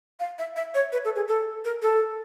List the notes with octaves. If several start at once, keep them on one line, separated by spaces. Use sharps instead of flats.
F5
E5
E5
C#5
B4
A4
G#4
A4
A#4
A4